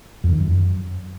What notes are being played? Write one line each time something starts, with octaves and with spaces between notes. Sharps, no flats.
F2
D#3
F#2